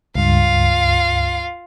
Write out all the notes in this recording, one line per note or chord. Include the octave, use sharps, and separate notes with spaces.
C#2 G2 F4 F5